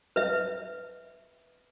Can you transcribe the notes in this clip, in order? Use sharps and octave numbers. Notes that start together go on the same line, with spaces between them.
B4 E5